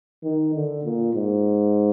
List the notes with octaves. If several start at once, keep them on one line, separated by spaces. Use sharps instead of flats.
D#3
D3
A#2
G#2